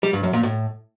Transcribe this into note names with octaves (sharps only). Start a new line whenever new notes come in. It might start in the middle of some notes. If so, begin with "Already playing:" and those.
G3
G2
F#2
A#2
A2